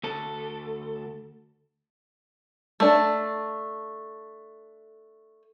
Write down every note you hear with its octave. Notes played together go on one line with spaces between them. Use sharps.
D2 A4
A3 D4